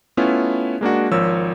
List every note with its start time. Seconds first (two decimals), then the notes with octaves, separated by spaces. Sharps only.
0.17 A3 B3 C#4 E4 F4
0.81 G#3 A#3 D4 F#4
1.11 G#1 F3 A#4 C#5 E6